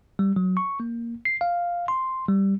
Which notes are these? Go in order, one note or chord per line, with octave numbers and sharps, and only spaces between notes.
G3
F#3
C#6
A#3
C7
F5
C6
G3